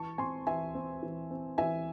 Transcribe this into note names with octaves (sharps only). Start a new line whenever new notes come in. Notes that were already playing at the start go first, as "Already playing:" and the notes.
Already playing: E3 A5 C#6
C4 G#5 C6
E3 E5 G#5
C4
E3
C4
E3 E5 G#5